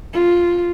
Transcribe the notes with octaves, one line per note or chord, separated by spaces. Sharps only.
F4